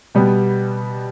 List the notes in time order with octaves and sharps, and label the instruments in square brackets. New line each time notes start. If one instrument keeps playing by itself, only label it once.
[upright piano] B2 G3 B3